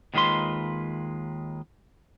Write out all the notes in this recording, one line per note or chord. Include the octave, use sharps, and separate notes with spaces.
D#2 D#3 G#3 F4 B4 C6